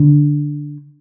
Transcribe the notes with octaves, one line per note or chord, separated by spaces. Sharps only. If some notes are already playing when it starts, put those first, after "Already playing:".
Already playing: D3